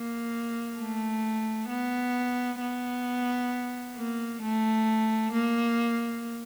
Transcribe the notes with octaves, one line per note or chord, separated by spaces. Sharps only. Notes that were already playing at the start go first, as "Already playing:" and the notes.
Already playing: A#3
A3
B3
B3
A#3
A3
A#3